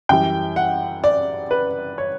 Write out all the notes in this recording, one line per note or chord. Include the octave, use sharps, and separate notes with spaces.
F#2 E3 G3 G5
F#5
D5
B4
C#5